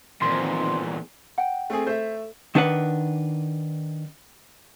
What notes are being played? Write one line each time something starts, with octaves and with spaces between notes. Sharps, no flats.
E2 A#2 D#3 F3 C4 C6
F#5 G5
A3 C4 G#4
A3 C5 E5
D#3 D4 B4 F#5